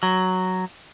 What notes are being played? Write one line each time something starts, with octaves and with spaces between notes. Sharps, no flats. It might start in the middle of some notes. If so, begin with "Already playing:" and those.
F#3